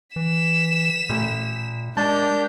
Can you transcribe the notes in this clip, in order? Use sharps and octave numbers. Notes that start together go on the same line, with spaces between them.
E3 B6 E7
A1 A#2
G#3 D4 G4 A#4 A5 G6